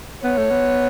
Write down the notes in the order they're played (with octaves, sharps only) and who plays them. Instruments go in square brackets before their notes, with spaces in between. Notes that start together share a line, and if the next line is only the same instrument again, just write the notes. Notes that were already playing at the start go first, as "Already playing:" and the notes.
[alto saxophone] B3 [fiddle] C#5
[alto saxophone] A3
B3